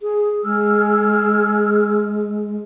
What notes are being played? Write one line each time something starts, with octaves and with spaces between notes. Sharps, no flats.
G#4
G#3 G#4 E6 F6